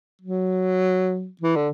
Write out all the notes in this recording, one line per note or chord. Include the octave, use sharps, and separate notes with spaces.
F#3
E3
D3